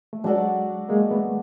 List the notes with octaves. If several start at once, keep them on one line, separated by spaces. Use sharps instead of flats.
A3
F#3 G#3 D4 F#4 A4 D5
G#3 A#3
A3 B3